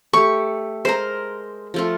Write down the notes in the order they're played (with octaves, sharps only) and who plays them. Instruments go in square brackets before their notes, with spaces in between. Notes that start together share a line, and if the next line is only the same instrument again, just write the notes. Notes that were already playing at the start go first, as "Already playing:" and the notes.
[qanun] A3 G4 [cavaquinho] C#6
[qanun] G#3 A#4 [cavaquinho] C5 A#5
[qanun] F3 A3 F4